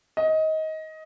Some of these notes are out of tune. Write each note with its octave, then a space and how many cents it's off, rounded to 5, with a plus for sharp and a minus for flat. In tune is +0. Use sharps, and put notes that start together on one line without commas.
D#5 +20